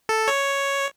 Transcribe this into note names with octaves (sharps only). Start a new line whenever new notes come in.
A4
C#5